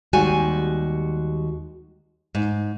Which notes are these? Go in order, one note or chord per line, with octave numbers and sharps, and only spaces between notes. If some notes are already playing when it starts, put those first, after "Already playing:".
D#2 G3 G#3 F#4 G#5
G#2